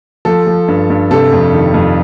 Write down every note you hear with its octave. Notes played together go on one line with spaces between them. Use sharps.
F3 A4
F3
G2
G2
C3 A4
F2
D#3
F2